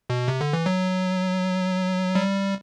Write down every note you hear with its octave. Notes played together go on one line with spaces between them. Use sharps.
B2
C3
D3
E3
F#3
G3